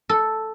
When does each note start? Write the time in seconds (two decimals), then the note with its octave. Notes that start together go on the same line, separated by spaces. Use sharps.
0.09 A4